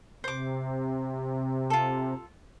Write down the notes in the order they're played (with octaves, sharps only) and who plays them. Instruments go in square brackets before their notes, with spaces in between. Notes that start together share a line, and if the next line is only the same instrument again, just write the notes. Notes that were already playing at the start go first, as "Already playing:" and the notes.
[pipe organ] C3 [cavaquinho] C5 D6
[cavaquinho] F4 A4